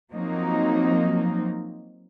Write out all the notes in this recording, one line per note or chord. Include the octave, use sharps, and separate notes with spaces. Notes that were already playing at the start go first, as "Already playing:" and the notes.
F3 F#3 A#3 C4 D#4